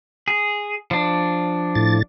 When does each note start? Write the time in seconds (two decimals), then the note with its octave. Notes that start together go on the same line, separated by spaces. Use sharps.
0.28 G#4
0.91 F3 D4
1.75 A2 A6